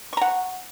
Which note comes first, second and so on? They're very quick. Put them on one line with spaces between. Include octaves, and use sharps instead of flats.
C#6 A#5 F#5